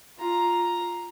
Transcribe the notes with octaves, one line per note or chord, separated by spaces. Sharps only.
F4 A#5